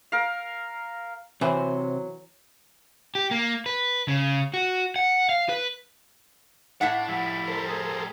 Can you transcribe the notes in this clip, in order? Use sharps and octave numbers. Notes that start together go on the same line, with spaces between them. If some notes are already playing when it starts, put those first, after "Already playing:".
A#4 F5
C3 E3 F#3 C5
G4
A#3
B4
C#3
F#4
F#5
F5
B4
A2 D5 E5 F#5 A5
F3 G3 E4
A4 A#4 C5
G#4